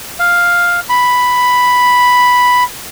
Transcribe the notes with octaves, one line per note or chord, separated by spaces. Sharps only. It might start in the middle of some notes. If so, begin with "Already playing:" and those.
F5
B5